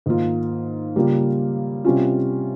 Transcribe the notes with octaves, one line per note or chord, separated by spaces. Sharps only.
G#2 D#3 A#3 F4
C#3 G3 A#3 F4
C3 G3 C#4 F4